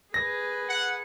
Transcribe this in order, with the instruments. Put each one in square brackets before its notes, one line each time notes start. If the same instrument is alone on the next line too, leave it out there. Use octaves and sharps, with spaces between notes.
[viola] G#4 B4 [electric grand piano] A#6
[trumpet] F#5 [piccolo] C#7